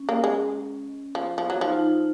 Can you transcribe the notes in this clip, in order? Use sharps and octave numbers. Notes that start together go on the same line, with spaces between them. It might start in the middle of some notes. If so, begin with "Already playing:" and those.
Already playing: C#4
A#3
G#3
F3
F3
F#3
F3 D#4
F4
D#4